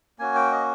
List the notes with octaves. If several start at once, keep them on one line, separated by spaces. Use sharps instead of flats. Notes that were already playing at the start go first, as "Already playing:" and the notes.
A#3 C#4 F#4 G#5
G5
D#5